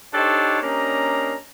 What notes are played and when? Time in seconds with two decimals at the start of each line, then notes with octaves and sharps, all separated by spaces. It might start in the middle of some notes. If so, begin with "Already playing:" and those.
0.14 D4 D#4 G4 A4 C5 C#5
0.62 A#3 C#4 D4 G4 D#5 A#5